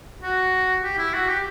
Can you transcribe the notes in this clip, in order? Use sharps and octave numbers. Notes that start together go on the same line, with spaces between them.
F#4
G4
E4
F#4
G4